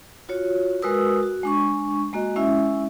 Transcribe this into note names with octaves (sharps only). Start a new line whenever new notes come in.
F4 F#4 C#5
G#3 F#4 A#4 B4 D#6 E6
F#4
G#3 D4 C#6
G#3 A#3 F#4 D#5
G#3 C#4 E4 E5